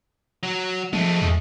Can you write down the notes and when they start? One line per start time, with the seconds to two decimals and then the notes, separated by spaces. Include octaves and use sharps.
0.43 F#3
0.93 F3 G#3 A3
1.22 E2